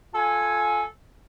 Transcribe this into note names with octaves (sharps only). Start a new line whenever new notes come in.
F4 A4 G#5